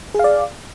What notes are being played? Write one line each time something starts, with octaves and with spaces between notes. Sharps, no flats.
G#4 D5 F5